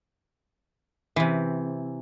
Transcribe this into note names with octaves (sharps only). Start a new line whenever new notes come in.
C3 E3